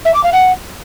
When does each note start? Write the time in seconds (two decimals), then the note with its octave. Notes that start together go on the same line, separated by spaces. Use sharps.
0.05 E5
0.14 D6
0.23 F5
0.33 F#5